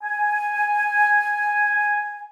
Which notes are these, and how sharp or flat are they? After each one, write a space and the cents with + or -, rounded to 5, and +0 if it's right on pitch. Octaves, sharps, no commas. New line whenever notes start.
G#5 +0